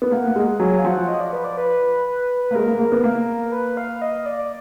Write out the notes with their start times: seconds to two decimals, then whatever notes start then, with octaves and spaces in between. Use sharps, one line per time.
0.02 B3
0.11 A#3 F#5
0.27 A#3
0.36 G#3
0.59 F#3 G#5
0.79 F5
0.85 F3 F#5
1.08 D#5
1.20 D5
1.33 B4
1.44 D5
1.57 B4
2.07 B4
2.43 B4
2.51 A#3
2.55 G#3 A#4
2.67 A#3
2.79 A#3
2.92 B3
3.04 A#3
3.52 B4
3.77 F5
4.02 D#5
4.26 D5